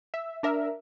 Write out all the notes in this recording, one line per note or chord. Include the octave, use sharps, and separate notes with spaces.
E5
D4 A#4 E5